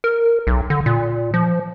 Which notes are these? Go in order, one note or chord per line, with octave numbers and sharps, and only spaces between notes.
A#4
B1
D3
A#2
F3